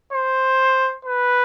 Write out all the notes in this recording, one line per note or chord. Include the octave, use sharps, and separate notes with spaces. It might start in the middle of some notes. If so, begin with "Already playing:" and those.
C5
B4